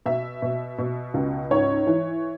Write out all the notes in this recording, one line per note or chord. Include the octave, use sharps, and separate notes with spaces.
B2 E5
B2
B2
C#2
G#2 C#5
E3